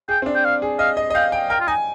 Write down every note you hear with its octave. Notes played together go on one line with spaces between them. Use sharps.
G#4 G5
C4
D4
G5
F5
G#4
D#5 F5
D#5
D#5
F5 G5
G5
A#4 G5
F4
D#4 G#5